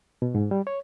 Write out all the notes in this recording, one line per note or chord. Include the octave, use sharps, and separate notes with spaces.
B2
G#2
G3
C#5